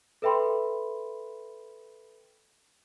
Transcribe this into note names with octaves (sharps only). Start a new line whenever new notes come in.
A4 B4 E5 G5 B5 C6